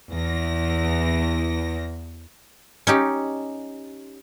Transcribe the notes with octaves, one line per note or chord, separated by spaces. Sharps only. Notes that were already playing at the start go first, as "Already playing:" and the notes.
E2 A#6
C#4 D#4 G4